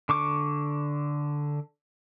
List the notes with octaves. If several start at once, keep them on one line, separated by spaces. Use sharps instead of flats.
D3 C#6 D6